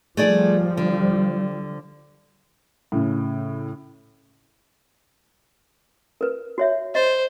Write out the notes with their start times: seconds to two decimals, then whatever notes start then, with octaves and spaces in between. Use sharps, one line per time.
0.17 F3 G3 A3 G#4 D5
0.77 D3
2.92 A2 C#3
6.21 A#4 B4
6.58 F#4 C#5 E5
6.95 C5 D#5